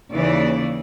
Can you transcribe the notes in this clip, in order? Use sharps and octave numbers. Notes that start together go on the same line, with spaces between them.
D#2 C#3 E3 D5